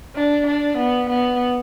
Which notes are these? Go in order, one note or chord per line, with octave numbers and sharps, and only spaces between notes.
D4
D4
B3
B3